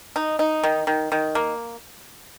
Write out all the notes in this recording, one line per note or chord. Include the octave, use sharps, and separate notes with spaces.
D#4
D#4
D#3
D#3
D#3
A#3